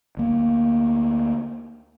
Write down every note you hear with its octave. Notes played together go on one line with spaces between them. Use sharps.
D2 A#3